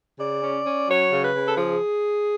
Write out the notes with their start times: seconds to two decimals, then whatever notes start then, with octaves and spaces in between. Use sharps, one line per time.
0.19 C#3 D5
0.42 C#4
0.65 C#4
0.88 F#3 C#5
1.11 C#3
1.23 B4
1.34 C#3
1.46 A4
1.57 F3 G#4